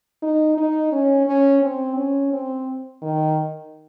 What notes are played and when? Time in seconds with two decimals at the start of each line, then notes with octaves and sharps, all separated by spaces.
0.22 D#4
0.57 D#4
0.92 C#4
1.27 C#4
1.62 C4
1.97 C#4
2.32 C4
3.02 D#3